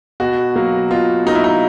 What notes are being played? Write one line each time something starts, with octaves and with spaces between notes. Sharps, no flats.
B2 F#4
F#3 A#3
B2 F4
F#3 A#3 D#4
E4
D#4